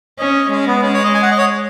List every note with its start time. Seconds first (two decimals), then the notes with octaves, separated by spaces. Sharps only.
0.19 C#4 D#5
0.50 G#3 C#4
0.67 B3
0.82 C#4
0.93 C#5
1.03 D#5
1.14 G#5
1.22 F#5
1.31 D#5
1.38 C#5